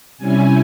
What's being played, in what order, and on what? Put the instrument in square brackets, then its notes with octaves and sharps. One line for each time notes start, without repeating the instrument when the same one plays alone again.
[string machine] C3 G3 C#4 E4 G#5